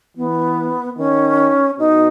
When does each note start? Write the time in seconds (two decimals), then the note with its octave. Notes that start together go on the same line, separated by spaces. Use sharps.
0.17 E3 B3
0.97 D#3 C#4
1.79 B2 D#4